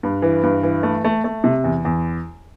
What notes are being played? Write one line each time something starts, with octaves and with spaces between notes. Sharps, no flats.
G2
E3
G2
E3
A3
A3
A3
C3
E2
E2